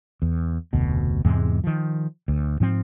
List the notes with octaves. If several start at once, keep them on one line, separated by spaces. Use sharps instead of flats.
E2
F1 D2 B2
E2 G#2 C3 G#3
D#3 F3
D2
G#2 F3 C4